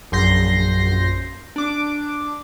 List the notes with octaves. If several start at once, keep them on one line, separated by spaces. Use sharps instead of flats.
A#1 F#2 C6 G6 A#6 C7
D4 D6